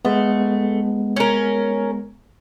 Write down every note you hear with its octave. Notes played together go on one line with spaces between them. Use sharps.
G#3 A3 B3
C#4 A#4